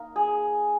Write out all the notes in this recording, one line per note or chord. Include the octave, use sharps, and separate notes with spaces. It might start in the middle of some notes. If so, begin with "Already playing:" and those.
Already playing: A#3 D#4
G#4